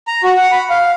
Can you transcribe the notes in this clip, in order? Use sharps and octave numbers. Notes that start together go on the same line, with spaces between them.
A#5
F#4
F#5
B5
F5